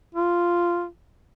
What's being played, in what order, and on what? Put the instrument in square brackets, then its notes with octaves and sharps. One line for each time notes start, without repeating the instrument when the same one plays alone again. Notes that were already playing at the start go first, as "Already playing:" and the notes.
[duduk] F4